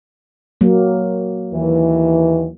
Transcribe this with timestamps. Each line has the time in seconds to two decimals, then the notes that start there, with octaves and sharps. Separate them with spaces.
0.61 F#3 A#3
1.53 D#2 E3